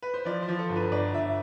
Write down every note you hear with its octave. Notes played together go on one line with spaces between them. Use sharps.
B4
C5
F3 D5
C5
F3
A4
G1
B4
G1 D5
G1 E5